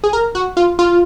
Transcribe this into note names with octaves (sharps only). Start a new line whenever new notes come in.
G#4
A#4
F#4
F4
F4